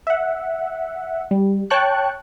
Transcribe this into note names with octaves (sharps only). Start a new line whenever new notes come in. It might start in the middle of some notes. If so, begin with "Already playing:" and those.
E5 F#5
G3
C#5 G5 A5 C#6 F#6